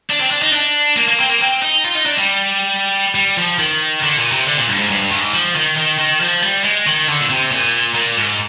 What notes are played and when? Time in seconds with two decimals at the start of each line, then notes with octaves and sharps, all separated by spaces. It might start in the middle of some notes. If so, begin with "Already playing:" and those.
0.10 D4
0.20 C4
0.31 D4
0.42 D#4
0.53 D4
0.97 A#3
1.08 A#3
1.19 C4
1.29 A#3
1.41 C4
1.62 D#4
1.84 F4
1.95 D#4
2.06 D4
2.17 G3
3.15 G3
3.37 F3
3.59 D#3
4.02 D3
4.18 A#2
4.32 C3
4.46 D3
4.57 A#2
4.68 G2
4.79 G#2
4.90 G2
5.12 G#2
5.33 F3
5.55 D#3
5.77 D#3
5.99 D#3
6.21 F3
6.43 G3
6.64 G#3
6.86 D#3
7.08 D3
7.20 A#2
7.30 C3
7.51 A#2
7.95 A#2
8.17 G#2